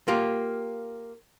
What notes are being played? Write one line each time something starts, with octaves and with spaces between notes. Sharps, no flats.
A#3 F4 G4